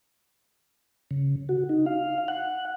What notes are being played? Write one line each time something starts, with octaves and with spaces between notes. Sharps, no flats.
C#3
F#4
D#4
F5
F#5